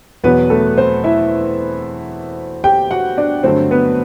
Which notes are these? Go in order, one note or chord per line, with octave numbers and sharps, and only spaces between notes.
E2 B2 F#3 B3 B4
A3 A4
C4 C5
E4 E5
G4 G5
F#4 F#5
D4 D5
G2 D3 F#3 A3 C4 C5
B3 B4